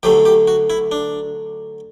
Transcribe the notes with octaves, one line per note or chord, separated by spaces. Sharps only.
D2 D3 F#3 A3 G4
G4
F#4
E4
D4